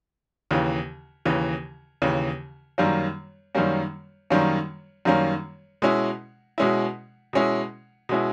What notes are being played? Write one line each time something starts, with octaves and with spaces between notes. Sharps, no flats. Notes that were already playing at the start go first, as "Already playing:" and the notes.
D#2 C#3 E3
D#2 C#3 E3
D#2 C#3 E3
F#2 D#3 G3 A#3 C#4
F#2 D#3 G3 A#3 C#4
F#2 D#3 G3 A#3 C#4
F#2 D#3 G3 A#3 C#4
B2 G#3 C#4 E4
B2 G#3 C#4 E4
B2 G#3 C#4 E4
B2 G#3 C#4 E4